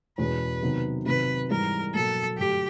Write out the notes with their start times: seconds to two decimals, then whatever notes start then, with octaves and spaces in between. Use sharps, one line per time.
0.18 E2 B2 G#3 C#4 B4
0.63 C3 D#3 F#3 B3
1.06 C3 D#3 F#3 B4
1.50 G#2 E3 G3 A#4
1.94 B2 F#3 A#3 A4
2.38 G2 D3 F#3 A3 G4